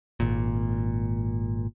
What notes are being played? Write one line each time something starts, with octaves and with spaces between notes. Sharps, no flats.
G#1 A#2